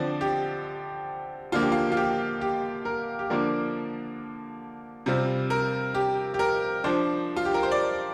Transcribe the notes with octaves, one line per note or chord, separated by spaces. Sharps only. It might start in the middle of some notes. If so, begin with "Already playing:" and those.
Already playing: D3 F3 C4 D5
G4
D3 F3 A#3 F4
G4
F4
F4
G4
G4
A#4
G4
D3 F3 A#3 D4 A#4
C3 G3 C4 F4
A#4
G4
G4
A#4
F3 D4 C5
F4
G4
A#4
C5
D5